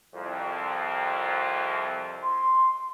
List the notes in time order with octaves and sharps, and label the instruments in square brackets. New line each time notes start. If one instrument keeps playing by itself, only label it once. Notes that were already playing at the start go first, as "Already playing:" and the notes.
[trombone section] C2 F2
[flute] C6